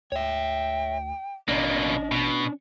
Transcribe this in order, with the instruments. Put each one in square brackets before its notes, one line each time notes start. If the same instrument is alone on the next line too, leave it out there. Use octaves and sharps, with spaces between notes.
[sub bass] D2 [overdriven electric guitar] C#5 E5 [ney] G5
[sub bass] A1 [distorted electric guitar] B2 A#3 [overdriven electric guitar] C#4 D4 [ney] D#5
[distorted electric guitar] B2